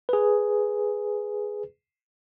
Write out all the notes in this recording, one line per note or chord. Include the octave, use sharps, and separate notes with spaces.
G#4 B4